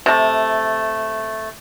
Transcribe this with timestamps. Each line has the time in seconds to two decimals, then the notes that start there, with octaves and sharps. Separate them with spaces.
0.06 C3 A3